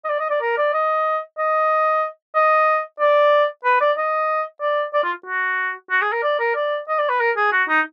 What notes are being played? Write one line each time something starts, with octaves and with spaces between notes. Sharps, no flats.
D#5
D5
D#5
D5
A#4
D5
D#5
D#5
D#5
D5
B4
D5
D#5
D5
D5
F4
F#4
F#4
G#4
A#4
D5
A#4
D5
D#5
D5
B4
A#4
G#4
F#4
D#4